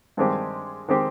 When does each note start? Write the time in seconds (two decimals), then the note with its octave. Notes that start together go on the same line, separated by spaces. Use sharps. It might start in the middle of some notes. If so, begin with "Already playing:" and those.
0.17 G2 D#3 G#3 C4 G4
0.89 D#3 G#3 C4 G4